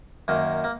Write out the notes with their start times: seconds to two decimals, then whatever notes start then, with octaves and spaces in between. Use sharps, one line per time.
0.28 F#2 D#3 A#3
0.64 A#3